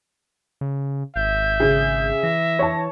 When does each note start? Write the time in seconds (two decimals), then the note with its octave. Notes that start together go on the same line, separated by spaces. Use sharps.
0.61 C#3
1.16 G#1 E5 G6
1.60 C#3 G#4
2.23 E3 A#6
2.59 C#5 A5